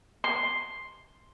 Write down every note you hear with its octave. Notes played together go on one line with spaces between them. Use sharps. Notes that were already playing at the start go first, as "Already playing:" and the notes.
C6